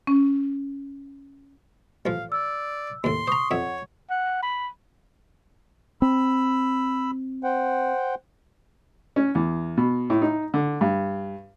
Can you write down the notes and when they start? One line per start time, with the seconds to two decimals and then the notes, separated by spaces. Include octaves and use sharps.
0.07 C#4
2.06 A1 F3 F5
2.32 D5 E6
3.04 D#2 A2 C6
3.28 C5 A#5 C#6 D#6
3.51 F2 C#5 E5 F#5
4.10 F#5
4.42 B5
6.02 C4 B5 E6
7.44 C5 F#5 G5
9.16 C#4
9.35 E2
9.77 B2
10.10 A2
10.22 D#4
10.54 D3
10.81 G2